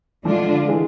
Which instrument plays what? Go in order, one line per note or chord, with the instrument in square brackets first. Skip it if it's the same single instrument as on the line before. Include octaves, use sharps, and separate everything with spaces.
[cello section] D3 G#3 D4 F4 [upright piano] F3 A3
[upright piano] E3 G#3